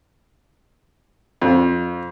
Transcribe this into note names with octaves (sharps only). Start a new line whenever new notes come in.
F2